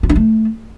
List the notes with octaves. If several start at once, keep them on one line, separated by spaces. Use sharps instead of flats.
F4
D4
A3